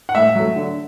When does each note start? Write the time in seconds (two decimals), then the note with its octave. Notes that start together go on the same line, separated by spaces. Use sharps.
0.09 F#5
0.15 A2 E5
0.35 F#3 A3
0.56 D3